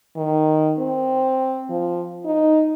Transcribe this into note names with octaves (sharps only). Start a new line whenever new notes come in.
D#3
C4
F3
D#4